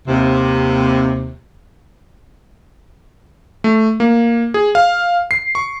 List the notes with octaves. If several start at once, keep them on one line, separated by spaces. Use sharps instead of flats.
D#2 C3
A3
A#3
G#4
F5
C7
C#6